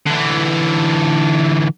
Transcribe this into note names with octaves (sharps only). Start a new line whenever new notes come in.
D3 E3